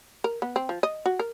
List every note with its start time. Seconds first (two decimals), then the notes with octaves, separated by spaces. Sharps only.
0.24 A#4
0.42 B3
0.56 C4
0.69 F3
0.83 D#5
1.06 F#4
1.19 A#4